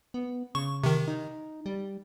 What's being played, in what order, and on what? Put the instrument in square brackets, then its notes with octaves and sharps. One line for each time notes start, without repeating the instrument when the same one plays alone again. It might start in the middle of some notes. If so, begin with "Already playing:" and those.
[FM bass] B3
[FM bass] C#3 [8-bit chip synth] C#6
[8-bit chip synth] C3 D#3
[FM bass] D#4
G3